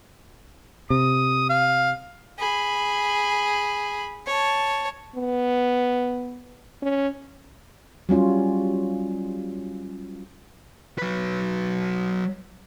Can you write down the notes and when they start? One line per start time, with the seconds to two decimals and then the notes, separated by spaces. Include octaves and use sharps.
0.90 C3 D#6
1.50 F5
2.39 G#4 B5
4.27 C#5 A5
5.16 B3
6.82 C#4
8.09 F#3 G3 C#4 F4
10.98 F#3 B4